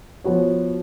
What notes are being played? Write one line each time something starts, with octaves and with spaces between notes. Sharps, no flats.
F3 B3 F#4 C#5